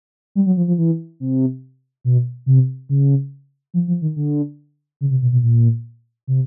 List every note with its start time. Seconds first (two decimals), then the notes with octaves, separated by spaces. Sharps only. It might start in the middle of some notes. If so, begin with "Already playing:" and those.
0.35 G3
0.46 F#3
0.57 F3
0.68 F3
0.78 E3
1.20 C3
2.05 B2
2.46 C3
2.89 C#3
3.74 F3
3.88 F3
4.02 D#3
4.16 D3
5.01 C#3
5.11 C3
5.22 B2
5.32 B2
5.43 A#2
6.28 C3